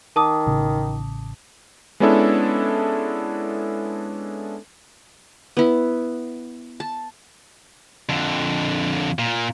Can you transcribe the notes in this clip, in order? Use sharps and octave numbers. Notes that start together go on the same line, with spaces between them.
D#3 A5 D6 D#6
A1 C#3
G#3 B3 C#4 D4 E4 A4
B3 E4
A5
F2 D3
A#2